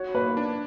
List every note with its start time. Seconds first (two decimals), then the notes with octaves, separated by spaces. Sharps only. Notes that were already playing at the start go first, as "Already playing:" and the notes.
Already playing: F#4 C#5
0.14 A#3 B4
0.37 D4